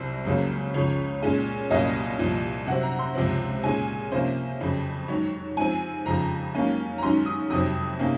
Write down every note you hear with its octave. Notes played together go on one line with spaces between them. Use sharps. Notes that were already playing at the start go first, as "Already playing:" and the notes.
Already playing: C2 C3 F#3 C4 C5
C#2 C#3 F#3 A#3 C#4
C#2 C#3 F3 C#5
A#2 G#3 C#4
C2 A#2 F#3 A#3 C#4 D#5
C2 A#2 F3
C3 F#3 C4 F#5
A#5
C6
C#2 C3 F3 C4
A#2 G#3 C#4 G#5
C3 F3 A#3 C#4 C5
F2 C#3 F#3
G#2 D#3 F#3 C#5
G#2 F3 C4 G#5
F2 C#3 F3 A#5
G#2 F#3 A#3 C#4
A#5
G#2 D#3 F#3 C#4 C6
D#6
F2 C3 D#3 F#3 C4 D#6
C3 D#3 A#3 C#4